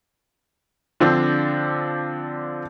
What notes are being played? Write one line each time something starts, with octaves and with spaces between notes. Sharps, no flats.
D3 F3 C4 D4